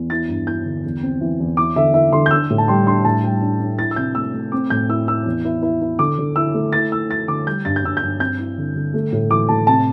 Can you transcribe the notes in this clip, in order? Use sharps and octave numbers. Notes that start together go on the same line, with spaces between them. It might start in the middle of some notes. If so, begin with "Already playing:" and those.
Already playing: E2
E4 A6
G2
E4 G6
D3
E2
C4
E3
E2
E4 D6
D3 E5
E4 E5
D3 C6
G6
D4 E6
A2
A5
G3 C6
D4 C6
A2 A5
G3 G5
D4
D4
E4 A6
E6
C3 G6
A3 E6
A3
C4 D6
A2 G6
E4 E6
E4 E6
E2
E4
E4
E4
D3 D6
D3
E4 E6
A3
E4 A6
E4 E6
E4 A6
D3 D6
G3 G6
G2 A6
G6
G2 E6
G2 G6
C4 G6
E4
D3
D3
A3
A2
E3 D6
A2 A5
C3 A5